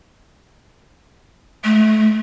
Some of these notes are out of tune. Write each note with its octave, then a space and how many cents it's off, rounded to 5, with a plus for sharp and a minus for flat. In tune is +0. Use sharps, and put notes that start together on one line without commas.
A3 -30